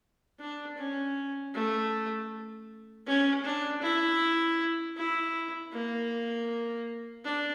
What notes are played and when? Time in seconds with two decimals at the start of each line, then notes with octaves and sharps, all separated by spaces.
0.39 D4
0.77 C#4
1.54 A3
3.06 C#4
3.44 D4
3.82 E4
4.97 E4
5.72 A#3
7.24 D4